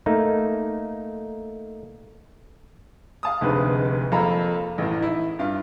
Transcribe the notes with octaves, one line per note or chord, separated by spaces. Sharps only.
A3 A#3 D#4
F5 A5 D#6
F1 D2 C3 G#3 D#4 B4
F2 A#3 A4 A#5 B5
A1 A2
D#4 E4
G2 F4